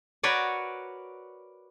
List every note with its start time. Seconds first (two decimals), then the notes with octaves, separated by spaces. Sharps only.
0.23 F#4 A#4 B4 C#5 D5